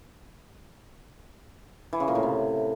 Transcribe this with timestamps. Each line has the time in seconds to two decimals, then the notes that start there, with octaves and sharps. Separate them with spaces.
1.93 E3
2.00 C#3
2.08 A#2
2.15 A2
2.23 C3